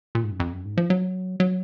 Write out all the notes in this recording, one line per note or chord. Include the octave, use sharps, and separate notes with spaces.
A#2
G#2
F#2
F2
F#2
G#2
F3
F#3
F#3